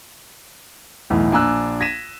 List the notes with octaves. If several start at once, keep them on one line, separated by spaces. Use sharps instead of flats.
B1 E2 A2
A#1 D4 G#5 A#5 E6 F#6
G#6 A#6 B6 D#7 E7